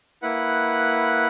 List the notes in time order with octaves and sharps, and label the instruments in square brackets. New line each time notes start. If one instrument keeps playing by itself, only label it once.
[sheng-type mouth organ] A#3 E4 B4 F#5